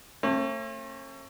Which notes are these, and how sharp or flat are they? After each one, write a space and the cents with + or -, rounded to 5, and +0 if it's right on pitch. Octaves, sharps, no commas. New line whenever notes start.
A3 +35 C#4 -45